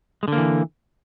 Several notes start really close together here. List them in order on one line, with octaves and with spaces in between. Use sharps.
G#3 D3 A#3 E3